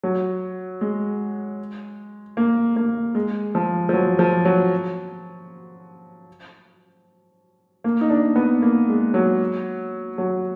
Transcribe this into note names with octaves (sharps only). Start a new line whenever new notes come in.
F#3
G#3
A#3
A#3
G#3
F3
F3
F#3
F3
F#3
A#3
D#4
D4
B3
A#3
G#3
F#3
F#3